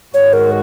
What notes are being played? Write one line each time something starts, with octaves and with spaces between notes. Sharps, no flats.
G#2 D#3 G#3 F#4 C#5
A#4